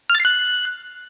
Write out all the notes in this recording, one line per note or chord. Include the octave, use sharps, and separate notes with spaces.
F6
A6
C7
F#6